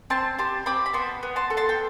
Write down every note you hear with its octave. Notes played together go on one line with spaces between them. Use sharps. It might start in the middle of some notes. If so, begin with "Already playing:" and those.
C4 A5 C6
G4 A5 C6
C4 B5 D6
B5
B3 A5 C6
B3
A5 C6
A4
A5 C6
G5